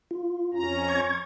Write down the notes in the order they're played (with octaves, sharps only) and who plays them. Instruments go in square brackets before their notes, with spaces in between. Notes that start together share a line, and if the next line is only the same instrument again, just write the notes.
[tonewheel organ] F4
[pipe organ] F2 C#4 A#5
[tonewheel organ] C#6 G#6